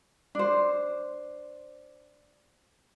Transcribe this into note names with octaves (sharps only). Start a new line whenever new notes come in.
D4 C5